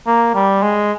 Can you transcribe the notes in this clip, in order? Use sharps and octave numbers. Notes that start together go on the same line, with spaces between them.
A#3
G3
G#3